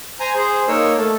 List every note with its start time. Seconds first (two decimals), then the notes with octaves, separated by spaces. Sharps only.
0.20 C5 G#5 A#5
0.35 G#4 C5
0.68 A#3 D#4 A#4 C#5 E6
0.98 A3 A4